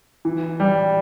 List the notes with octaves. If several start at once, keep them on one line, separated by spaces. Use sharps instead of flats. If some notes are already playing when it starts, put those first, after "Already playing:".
E3
G3